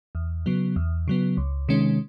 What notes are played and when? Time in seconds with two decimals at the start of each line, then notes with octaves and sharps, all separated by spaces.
0.15 E2
0.46 C#3 F#3 B3
0.76 E2
1.08 C#3 F#3 B3
1.37 C#2
1.69 C3 D#3 G#3 C#4